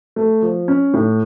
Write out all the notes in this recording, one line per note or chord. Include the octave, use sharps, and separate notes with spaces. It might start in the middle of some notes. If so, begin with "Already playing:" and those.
A3
F3
C#4
A2